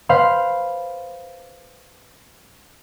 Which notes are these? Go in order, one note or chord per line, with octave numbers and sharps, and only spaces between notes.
B4 C5 F5